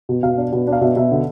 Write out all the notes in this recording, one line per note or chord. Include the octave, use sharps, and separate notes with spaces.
B2
B2 F5
D4
B2
D4
F5
B2 E5
B2 E5
D3